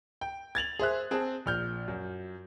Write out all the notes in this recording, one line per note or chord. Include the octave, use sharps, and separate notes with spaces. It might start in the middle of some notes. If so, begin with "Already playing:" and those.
G5
G#6 A6 F7 F#7
G#4 C5 E5 F#6
C4 G#4 A5
A#1 F6 G6
F#2